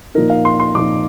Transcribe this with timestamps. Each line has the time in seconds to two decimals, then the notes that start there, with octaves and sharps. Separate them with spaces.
0.15 A#2 F3 A#3 D#4 A#4
0.30 F5
0.45 C6
0.60 C6
0.75 A#2 F3 A#3 D#4 D6